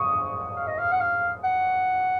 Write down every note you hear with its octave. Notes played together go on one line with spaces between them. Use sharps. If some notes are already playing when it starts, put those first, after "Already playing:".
Already playing: C#6 D#6
F5
D#5
F5
F#5
F5
F#5